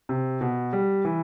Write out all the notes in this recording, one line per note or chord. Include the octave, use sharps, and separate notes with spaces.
C3
B2
G3
E3